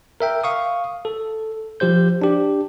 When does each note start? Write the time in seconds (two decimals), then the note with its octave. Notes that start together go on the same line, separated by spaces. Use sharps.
0.20 A#4 E5 G5
0.44 F5 C#6 D#6
1.05 A4
1.80 F3 G4 C5 G6
2.22 D4 G4